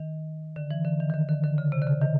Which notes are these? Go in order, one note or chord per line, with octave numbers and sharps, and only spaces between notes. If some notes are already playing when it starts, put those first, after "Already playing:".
Already playing: D#3
D3
E3
D3
D#3
D#3
D3
D3
D3
C#3
C3
D3
C#3
D#3